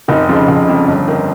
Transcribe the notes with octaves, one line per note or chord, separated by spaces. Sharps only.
F1 D#3 D#4
F2 C#3 F3 F4
F1
F2 C#3
G1
D#3